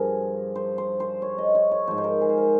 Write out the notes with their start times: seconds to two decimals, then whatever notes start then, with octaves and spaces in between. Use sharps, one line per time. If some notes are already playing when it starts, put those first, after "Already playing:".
Already playing: G2 F3 G#4 A#4
0.56 C5
0.78 C5
1.00 C5
1.22 C#5
1.38 D#5
1.55 C#5
1.71 C#5
1.88 G#2 F3 C5
1.98 C5
2.04 A#4
2.21 G#4
2.29 C5
2.37 A#4